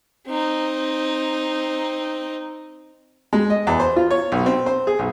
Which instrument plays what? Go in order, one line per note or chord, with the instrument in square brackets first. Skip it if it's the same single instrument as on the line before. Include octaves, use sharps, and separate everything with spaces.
[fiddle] C4 D#4
[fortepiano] G#3
D#5
E2
C5
F4
C#5
B1
C4
C5
G#4
B1